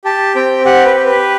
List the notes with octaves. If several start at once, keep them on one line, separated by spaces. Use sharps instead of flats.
G4 A5
C4 G5
G4 F#5
B4
G4
B4